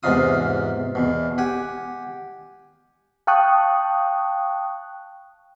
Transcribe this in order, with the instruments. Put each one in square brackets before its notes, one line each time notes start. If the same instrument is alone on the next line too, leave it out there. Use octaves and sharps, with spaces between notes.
[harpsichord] E2 G#2 C3 D#4 F4 D#6
E2 B2
G4 F#5 G#5
[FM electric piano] F5 G5 A5 C#6 D#6 F#6